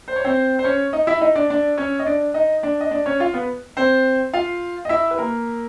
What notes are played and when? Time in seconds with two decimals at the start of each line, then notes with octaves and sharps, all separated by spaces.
0.08 C5
0.16 C#5
0.24 C4 C5
0.59 C5
0.65 C#4 C#5
0.93 D#4 D#5
1.07 E4 E5
1.21 D#4 D#5
1.35 D4 D5
1.50 D4 D5
1.78 C#4 C#5
1.99 D#5
2.06 D4 D5
2.34 D#4 D#5
2.63 D4 D5
2.81 D#5
2.91 D4 D5
3.06 C#4 C#5
3.20 F4 F5
3.34 B3 B4
3.77 C4 C5
4.33 F4 F5
4.85 D#5
4.89 E4 E5
5.11 B4
5.18 A#3 A#4